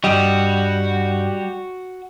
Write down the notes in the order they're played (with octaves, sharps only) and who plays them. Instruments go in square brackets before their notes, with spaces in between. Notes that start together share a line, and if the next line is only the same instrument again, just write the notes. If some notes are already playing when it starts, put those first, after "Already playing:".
[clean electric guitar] G2 D#5 [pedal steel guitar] G3 [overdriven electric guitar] F#4